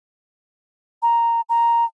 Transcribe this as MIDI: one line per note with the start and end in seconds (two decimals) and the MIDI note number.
1.02 1.41 82
1.49 1.85 82